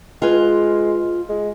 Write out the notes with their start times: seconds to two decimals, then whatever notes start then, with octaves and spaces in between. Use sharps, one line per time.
0.22 G#3 F4 B4 G#5
1.29 G#3